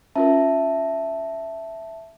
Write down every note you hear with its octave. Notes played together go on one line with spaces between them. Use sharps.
C#4 F4 A#4 E5 A5